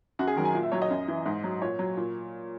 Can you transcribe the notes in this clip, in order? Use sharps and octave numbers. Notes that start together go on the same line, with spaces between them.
F#2 F#4
G#4
D#3 F#3 A#4
G#5
A#2
E5
F#3 C#5
D#5
F#2
E3
G#2
F#3
A#2 C#5
F#3
A#2